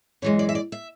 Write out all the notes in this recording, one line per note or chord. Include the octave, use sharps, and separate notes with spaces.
F#2 E3 G#3 C#5
D5
E5
D5
E5